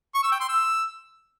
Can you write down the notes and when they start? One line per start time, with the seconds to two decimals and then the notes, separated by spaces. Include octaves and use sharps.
0.14 C#6
0.23 E6
0.32 G5
0.40 C6
0.49 E6